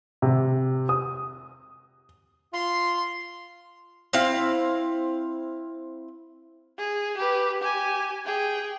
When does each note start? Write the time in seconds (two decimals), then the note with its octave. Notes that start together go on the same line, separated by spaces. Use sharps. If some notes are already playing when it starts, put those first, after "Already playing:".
0.22 C3
0.89 D#6
2.54 F4 C6
4.13 C4 E4 F5
6.78 G#4
7.17 G4 B4
7.61 G4 G#5
8.26 G#4 G5